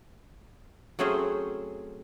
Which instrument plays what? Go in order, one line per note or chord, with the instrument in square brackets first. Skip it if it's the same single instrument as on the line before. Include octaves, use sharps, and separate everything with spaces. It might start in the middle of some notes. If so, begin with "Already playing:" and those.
[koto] F#3 A3 C4 C#4 G#4 C5